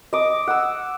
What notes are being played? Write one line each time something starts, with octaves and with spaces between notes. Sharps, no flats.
D#5 D6
F#5 E6